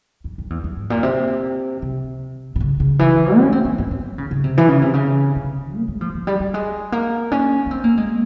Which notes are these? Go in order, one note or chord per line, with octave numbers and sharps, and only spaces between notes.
F2
F2
E2
F2
G#2
A#2
C3
C3
C3
C#3
C#3
E3
C#4
C4
C4
C#4
C4
F3
C#3
C#3
C3
E3
C#3
C3
C#3
C3
A#3
G#3
F3
F3
G3
G3
G#3
A#3
C#4
C#4
C4
A#3
G#3